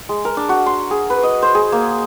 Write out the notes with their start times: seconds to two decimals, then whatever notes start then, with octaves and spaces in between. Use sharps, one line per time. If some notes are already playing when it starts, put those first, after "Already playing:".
0.09 G#3
0.25 A#4
0.37 D4
0.49 F#4
0.66 C6
0.91 G#4
1.10 B4
1.23 D#5
1.42 C5
1.55 G#4
1.72 A#3